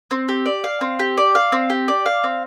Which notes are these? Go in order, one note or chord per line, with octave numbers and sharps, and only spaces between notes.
C4
G4
D5
F5
C4
G4
D5
F5
C4
G4
D5
F5
C4